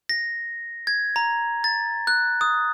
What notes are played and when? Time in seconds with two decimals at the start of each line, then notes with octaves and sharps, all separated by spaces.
0.09 A#6
0.87 G#6
1.16 A#5
1.64 A6
2.07 F#6
2.41 D#6